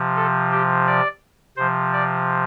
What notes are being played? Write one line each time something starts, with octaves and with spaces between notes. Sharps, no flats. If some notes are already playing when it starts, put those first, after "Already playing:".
Already playing: C3 F3
A4
G4
D5
C3 F3 C5
D5